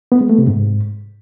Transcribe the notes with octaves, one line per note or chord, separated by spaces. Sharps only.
B3
G#3
A3
C3
G#2